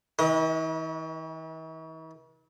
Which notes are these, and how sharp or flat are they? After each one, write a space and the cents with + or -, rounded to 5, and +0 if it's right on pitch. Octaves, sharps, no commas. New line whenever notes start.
E3 -45 B4 -35 D#5 +15